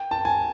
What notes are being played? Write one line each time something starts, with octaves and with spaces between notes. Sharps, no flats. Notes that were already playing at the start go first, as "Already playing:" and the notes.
Already playing: G5
A5
G#5